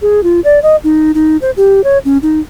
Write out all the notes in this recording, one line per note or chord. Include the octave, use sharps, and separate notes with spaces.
G#4
F4
D5
D#5
D#4
D#4
C5
G4
C#5
C#4
D#4